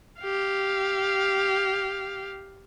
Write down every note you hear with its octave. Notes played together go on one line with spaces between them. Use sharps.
G4 F5